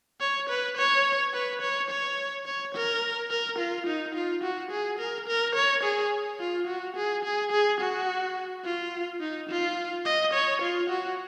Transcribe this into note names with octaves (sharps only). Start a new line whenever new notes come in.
C#5
B4
C#5
B4
C#5
C#5
C#5
A#4
A#4
F4
D#4
F4
F#4
G#4
A#4
A#4
C#5
G#4
F4
F#4
G#4
G#4
G#4
F#4
F4
D#4
F4
D#5
C#5
F4
F#4